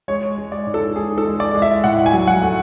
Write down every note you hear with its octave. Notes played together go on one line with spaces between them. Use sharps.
G#3 C#5
G#3
D5
G#2
A4
G#2 G#4
A4
G#3
D5
G#3
E5
A2 F#5
G#5
F#3
F#5
A3